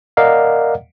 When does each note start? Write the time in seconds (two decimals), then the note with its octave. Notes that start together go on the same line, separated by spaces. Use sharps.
0.17 A#4 D5 D#5 F5 F#5